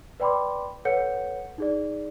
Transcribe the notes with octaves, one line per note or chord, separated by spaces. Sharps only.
B4 D5 G5 B5 C6 D6
A4 B4 C#5 F#5 G6 C#7
D#4 G#4 D5